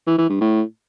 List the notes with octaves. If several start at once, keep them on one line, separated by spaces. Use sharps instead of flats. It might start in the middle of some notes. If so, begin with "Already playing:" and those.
E3
E3
G2
A2